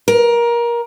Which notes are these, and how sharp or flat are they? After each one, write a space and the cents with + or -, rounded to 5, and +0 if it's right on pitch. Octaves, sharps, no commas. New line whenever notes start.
A#4 +20